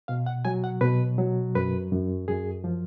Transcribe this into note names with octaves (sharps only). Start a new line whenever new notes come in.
B2 F5
F#5
F#3 G#5
F#5
B2 B4
F#3
F#2 B4
F#2
F#2 G#4
F3